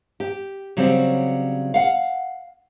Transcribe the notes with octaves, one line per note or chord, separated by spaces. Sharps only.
G4
C#3 F#3 G3 C4
F5 F#5